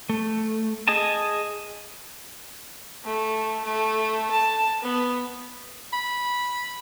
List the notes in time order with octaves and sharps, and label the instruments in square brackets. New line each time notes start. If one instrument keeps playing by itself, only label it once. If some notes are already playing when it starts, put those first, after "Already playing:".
[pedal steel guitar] A3
G#4 D#5 G#5 A5
[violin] A3
A3
A5
B3
[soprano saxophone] B5